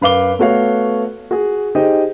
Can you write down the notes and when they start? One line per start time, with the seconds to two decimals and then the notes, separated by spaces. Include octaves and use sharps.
0.01 F#2 B4 F5 D6 G7
0.39 A3 B3 F#4 C#5 F5
1.31 F#4 G#4
1.75 D#4 G4 G#4 C5 D#5